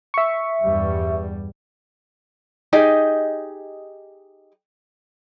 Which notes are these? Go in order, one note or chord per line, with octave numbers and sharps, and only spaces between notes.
E5 C#6
E2 G2 G3
D#4 G4 G#4 D#5